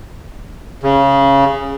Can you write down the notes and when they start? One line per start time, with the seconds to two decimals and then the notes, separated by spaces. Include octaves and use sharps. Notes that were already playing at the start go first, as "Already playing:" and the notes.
0.83 C#3